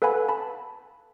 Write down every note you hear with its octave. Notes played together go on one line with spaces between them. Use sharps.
A4 B4 F5 F#5 G#5 B5
A5 B5